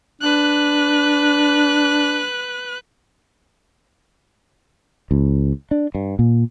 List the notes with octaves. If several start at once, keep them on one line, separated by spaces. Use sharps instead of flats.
D4 B4 F#6
C#2
D4
G2
A#2